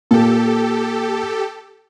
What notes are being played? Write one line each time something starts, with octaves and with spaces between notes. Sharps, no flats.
A#2 G4 A4